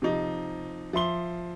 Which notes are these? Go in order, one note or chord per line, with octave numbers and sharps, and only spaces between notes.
C3 F3 D#4
F3 E5 C6 G7